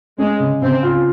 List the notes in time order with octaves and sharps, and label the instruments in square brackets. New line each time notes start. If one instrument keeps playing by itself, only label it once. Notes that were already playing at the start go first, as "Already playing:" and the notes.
[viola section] G#3 [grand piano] C#4
[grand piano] C#3
[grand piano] C#3 [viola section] C4
[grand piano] F4